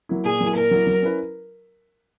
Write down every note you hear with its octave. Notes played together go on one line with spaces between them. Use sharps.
F#3 A#3 E4
A#2 G#4
F#3 A#3 E4
A#2 A#4
F#3 A#3 E4
F#3
C#4 E4 B4